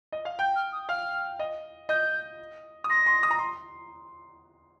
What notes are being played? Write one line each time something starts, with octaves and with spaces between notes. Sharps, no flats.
D#5
F5
G5 G6
F6
D#6
F5 F6
D#5
D#5 G6
D#6
C6 A#6
C6
D#6
A#5
C6